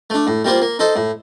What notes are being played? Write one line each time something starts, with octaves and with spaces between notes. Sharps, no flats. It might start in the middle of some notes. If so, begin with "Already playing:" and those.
A3 D4
A2
G3 A#3 F4 C5
A#3
D#4 A4 C5
A2